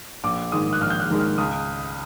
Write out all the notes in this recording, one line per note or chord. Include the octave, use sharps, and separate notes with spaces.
A#1 D6
G#2 D#3 G#3 D#6
F#6
A#1 F6
G6
F#6
G#2 D#3 G#3
F6
C#2 D#6